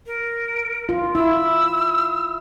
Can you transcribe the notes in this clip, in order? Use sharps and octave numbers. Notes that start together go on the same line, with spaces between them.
A#4
F4
E4 E6